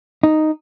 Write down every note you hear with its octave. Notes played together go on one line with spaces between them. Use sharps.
D#4